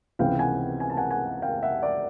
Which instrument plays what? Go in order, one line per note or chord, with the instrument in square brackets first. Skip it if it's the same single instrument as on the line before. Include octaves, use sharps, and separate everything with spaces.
[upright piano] C#2 C3 E3 G#3 B3 F5 G5
F#5 G#5
G#5
A5
F#5 G#5
F#5 G#5
F5 G5
E5 F#5
D5 E5